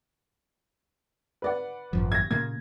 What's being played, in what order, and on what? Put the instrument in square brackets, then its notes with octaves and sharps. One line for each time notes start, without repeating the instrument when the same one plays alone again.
[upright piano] B4 D5 F#5
[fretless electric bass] G#1 F#2 F3
[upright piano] G#6 A#6
[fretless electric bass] A#2 C#3 A#3 [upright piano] G#6